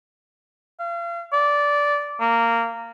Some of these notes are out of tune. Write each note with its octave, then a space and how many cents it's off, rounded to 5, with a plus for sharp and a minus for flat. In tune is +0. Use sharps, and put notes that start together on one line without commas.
F5 -35
D5 -15
A#3 -15